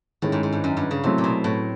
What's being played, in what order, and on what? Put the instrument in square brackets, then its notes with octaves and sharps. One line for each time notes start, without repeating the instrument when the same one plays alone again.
[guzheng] A2 [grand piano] D#3 G#3 C#4 E4
[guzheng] G#2
G#2
G2
F#2
G2
C#3
[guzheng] C3 [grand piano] F#3 A3 C4 E4
[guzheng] A#2
B2
A2